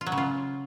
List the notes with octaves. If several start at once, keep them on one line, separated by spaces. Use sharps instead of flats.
F4
F#3
C#3
F4